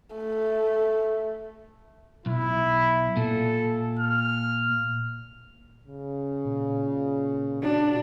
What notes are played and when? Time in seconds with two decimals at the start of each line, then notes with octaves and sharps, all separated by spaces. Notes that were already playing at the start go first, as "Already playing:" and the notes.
0.16 A3
2.26 B1 E4
3.17 A#2 A4
3.99 F6
5.87 C#3
6.45 A#2
7.62 D4 F#4